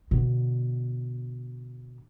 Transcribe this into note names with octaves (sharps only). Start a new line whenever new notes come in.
B2 D3